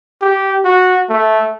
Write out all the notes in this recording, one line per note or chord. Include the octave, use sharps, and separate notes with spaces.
G4
F#4
A3